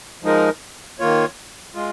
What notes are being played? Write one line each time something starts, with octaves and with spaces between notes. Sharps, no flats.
F3 G#3 D#4 A#4
D#3 A#3 F4 C#5
G#3 F4